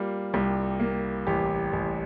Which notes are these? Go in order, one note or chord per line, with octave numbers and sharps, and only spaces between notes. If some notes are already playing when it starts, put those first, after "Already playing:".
Already playing: G3 A#3 F4
C2 G4
A#3
A1 G4
A1